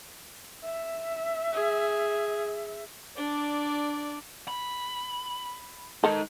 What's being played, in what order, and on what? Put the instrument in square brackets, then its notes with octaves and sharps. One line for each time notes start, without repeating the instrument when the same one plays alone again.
[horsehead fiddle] E5
[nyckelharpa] G#4
[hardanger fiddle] D4 D5
[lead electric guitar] B5
[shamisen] D#3 A4 [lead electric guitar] G#3 D#4